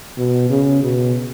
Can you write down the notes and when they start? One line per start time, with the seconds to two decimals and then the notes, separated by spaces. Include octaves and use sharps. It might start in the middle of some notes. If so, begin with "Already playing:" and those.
0.17 B2
0.49 C#3
0.83 B2